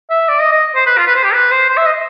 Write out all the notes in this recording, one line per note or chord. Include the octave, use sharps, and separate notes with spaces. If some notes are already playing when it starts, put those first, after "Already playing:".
E5
D5
D#5
D#5
C5
B4
F4
B4
C5
G4
B4
C5
C5
E5
D#5